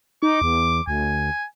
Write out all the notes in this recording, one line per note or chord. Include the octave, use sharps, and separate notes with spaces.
D#4 D6
E2
D2 G#5